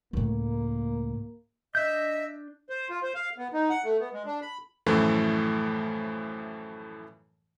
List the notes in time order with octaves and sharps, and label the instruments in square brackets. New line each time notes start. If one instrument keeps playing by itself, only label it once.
[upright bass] C#2 A2 [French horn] A#3
[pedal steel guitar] D4 G6 [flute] D#5 [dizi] E5
[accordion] C5
F4
C5
F5
B3
D#4
F#5
A3
B3
G#3
D4
B5
[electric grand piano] F#2 A2 E3 F3 A3